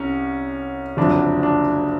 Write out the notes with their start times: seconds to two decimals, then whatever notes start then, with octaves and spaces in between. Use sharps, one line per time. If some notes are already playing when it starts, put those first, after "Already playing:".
Already playing: C2 C#4
0.97 F#1 F2 D3 F#3 D4
1.43 D4